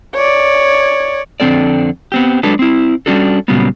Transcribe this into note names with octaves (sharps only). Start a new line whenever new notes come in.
C#5 D5
F2 D3 F3 C4 A4 D5
B3 C4 G4
F#3 G#3 D4 A4 B4
C4 E4
G3 G#3 C#4 D4 F#4 A4
A#2 C#3 F#3 G3 B3